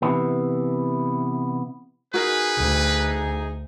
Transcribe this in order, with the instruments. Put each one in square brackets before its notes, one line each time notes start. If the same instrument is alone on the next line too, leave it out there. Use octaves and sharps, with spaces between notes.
[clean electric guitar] C3 E3 B3
[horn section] D#4 G#4 [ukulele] F#4 A#4 [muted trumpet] B4
[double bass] D2